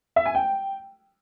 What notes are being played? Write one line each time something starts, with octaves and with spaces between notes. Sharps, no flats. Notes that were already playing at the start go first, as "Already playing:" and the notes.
E5
G#5
G5